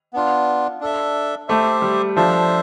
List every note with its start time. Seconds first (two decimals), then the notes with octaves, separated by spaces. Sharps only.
0.13 B3 D4 F4
0.81 D4 A4 E5
1.48 A3 G4 C5 E5
1.82 G3
2.16 F3 D4 A4 C5 E5